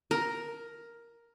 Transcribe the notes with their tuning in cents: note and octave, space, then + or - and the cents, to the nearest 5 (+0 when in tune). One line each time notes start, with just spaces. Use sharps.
A#4 +5